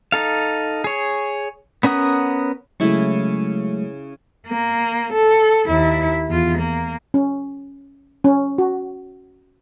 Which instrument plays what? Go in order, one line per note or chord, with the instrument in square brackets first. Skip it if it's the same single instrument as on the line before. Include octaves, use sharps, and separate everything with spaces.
[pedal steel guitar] D#4 A4 F5
G#4 C#5
B3 C#4 A#4 F#5 D#6
[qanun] C#3 E4 C#6 [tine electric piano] F#3 G#3 A3
[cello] A#3
A4
D#2 E4
E2 F4
A#3
[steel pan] C#4
C#4
F#4